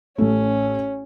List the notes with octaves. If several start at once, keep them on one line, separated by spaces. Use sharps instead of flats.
A1 A3 C#4